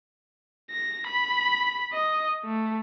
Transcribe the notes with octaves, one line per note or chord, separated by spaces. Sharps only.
A#6
B5
D#5
A3